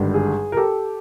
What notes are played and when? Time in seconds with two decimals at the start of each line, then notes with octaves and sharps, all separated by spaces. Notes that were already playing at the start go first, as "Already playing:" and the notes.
Already playing: G#1 G2 D3 G3
0.14 G#4
0.52 A#4
0.57 G4 A4